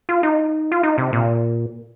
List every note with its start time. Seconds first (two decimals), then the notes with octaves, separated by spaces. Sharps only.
0.09 F4
0.23 D#4
0.72 F4
0.83 D#4
0.98 C3
1.13 A#2